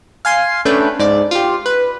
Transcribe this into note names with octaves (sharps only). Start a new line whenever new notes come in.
F5 G#5 C6 C7
A3 C#4 D4 B4 G5
G#2 D5
F4 G4
B4